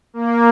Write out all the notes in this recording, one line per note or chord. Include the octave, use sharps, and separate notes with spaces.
A#3